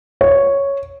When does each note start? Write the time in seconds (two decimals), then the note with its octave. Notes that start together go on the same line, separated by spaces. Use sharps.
0.21 C#5